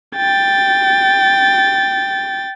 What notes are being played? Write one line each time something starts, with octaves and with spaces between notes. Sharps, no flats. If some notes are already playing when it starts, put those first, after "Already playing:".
G5 A6